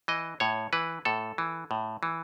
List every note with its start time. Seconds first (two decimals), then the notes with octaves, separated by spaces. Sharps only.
0.08 E3 D#5
0.40 A2 C#5
0.73 E3 B4
1.05 A2 A4
1.38 E3
1.71 A2
2.03 E3